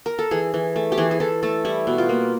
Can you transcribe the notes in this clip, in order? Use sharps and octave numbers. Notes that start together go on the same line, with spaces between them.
A#4
A4
E3 G#4
E3
A3
G4
E3 G#4
G#4
E3 A4
A3 A4
G3 E4
B2
F4
A#3